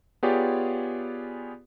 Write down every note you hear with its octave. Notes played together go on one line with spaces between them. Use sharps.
B3 F4 G4 G#4 C#5 D5